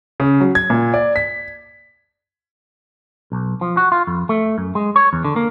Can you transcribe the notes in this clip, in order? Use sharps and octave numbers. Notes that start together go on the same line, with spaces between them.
C#3
F#3
G#6
A#2
D5
B6
B1
F3
F#4
F4
F2
A3
F#2
G#3
C#5
E2
D3
A#3